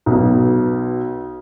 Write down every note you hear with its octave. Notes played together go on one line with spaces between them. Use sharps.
B1 B2